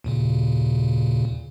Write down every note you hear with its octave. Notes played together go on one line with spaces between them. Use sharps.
D#2 A#2 C#3